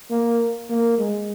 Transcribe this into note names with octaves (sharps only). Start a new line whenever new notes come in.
A#3
A#3
G#3